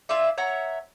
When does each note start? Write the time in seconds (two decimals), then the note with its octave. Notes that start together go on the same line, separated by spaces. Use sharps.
0.09 E4 F4 D5 E5
0.38 C#5 E5 F#5 A#5